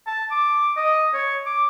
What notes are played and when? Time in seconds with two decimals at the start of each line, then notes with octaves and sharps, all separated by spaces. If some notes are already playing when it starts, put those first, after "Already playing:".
0.07 A5
0.31 D6
0.77 D#5
1.14 C#5
1.46 D6